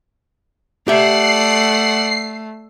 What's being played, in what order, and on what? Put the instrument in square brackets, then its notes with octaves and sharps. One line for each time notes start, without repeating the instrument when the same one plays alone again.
[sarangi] A3 [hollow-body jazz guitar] G4 E5 [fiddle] D5 F#5 [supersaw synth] C7